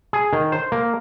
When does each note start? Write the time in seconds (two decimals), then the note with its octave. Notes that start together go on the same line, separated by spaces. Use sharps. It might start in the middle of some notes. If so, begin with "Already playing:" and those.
0.13 G#4
0.33 D#3
0.52 C5
0.72 A#3